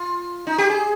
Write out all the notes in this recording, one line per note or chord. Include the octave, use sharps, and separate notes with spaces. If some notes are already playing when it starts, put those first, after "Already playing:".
Already playing: F4
D#4
G4
G#4